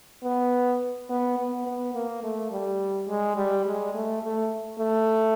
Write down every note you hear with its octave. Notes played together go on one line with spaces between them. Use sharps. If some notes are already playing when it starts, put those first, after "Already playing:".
B3
B3
B3
B3
A#3
A3
G3
G#3
G3
G#3
A3
A3
A3